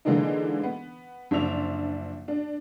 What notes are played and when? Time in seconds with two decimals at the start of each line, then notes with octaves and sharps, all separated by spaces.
0.05 D3 E3 G#3 A#3 D4 D#4
0.63 B3
1.31 F#1 F3 D4 E5 F7
2.28 D4